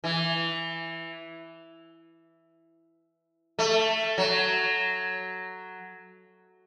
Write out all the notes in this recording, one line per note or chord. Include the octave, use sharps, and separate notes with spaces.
E3
A3
F#3